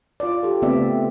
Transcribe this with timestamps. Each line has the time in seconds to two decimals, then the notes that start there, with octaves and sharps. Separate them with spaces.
0.20 F4 D5
0.43 G4 A4
0.62 C#3 A3 B3 C4 D5 E5